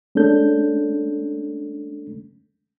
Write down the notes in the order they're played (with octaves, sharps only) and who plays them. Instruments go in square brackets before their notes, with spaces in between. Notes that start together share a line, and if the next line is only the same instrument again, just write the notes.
[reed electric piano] G#3 A3 C#4 D4 A4 G6